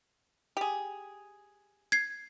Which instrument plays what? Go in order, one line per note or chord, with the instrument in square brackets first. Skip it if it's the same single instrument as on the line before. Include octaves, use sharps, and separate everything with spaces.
[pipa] G4 G#4
[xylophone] G#6 C7